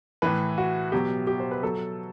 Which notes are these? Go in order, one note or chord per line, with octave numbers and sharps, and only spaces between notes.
A2 E3 B4
F#4
B2 F#3 G4
G4
C5
B4
B2 F#3 A4